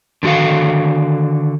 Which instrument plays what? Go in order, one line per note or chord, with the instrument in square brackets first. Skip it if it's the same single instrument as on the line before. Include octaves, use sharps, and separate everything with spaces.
[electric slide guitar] D3 D#3 F#4 A4 F5